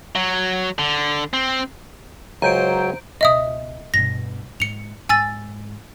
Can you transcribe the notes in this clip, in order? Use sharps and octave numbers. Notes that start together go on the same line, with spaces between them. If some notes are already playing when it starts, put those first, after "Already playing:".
F#3
D3
C4
C#2 F#3 C5 G5 G#5 A#5 G6 D7
C#2 B2 D#5 E5 D#6
G2 B2 A#6
G#2 C#7 F7
G#2 G#5 E6 A6